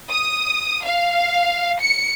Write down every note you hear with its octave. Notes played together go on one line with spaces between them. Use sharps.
D#6
F5
C#7